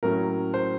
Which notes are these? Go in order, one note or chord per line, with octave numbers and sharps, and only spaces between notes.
A2 F#3 A#3 C#4 A#4
C5